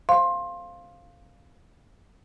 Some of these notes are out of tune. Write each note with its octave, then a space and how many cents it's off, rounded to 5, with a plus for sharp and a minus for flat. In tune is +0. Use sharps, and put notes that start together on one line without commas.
C5 +0 F5 +0 C6 +20